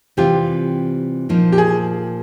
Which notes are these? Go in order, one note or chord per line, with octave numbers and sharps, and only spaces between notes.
C3 E3 G3 C4 F4 G4
A#2 F3 A#3 D#4
G4
G#4